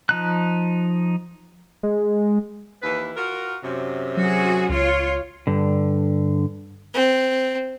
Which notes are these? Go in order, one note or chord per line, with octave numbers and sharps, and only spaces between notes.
F3 D#4 F#6
G#3
D#2 E3 B4
F4 F#4 A#4
F#2 C3
F#3 F#4 G#4
C#2 F4 C#5
G2 D3
C4